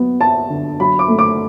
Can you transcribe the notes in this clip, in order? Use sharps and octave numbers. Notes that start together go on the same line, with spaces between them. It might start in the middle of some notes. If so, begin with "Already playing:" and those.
Already playing: F#3 B3
B3 A5
D3
F#3 B5
D6
A3
D6